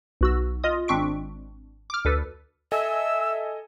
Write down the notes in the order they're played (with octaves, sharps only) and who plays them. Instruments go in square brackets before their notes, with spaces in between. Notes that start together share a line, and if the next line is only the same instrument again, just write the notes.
[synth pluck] B1 F#4 E6
F4 D#5 D#6
G#1 C4 D4 C#6 B6 D7
D6 F6
D2 A4 B4
[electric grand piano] A4 D#5 G#5 [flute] E5 [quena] E6